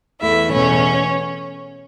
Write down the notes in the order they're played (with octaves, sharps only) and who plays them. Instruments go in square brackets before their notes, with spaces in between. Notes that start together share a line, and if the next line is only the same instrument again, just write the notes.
[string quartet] E2 E3 A3 E4 E5
E2 B2 A3 C#4 C#5